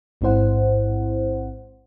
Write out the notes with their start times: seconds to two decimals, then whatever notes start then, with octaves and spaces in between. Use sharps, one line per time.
0.21 A1 G#2 C4 E4 C5 F#5